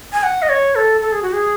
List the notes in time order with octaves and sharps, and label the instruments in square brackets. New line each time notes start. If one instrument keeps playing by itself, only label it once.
[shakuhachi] G#5
F#5
D#5
C#5
A4
A4
G#4
F#4
G#4